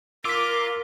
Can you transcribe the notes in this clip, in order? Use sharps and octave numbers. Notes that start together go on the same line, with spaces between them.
F4 A#4 D6 E6 B6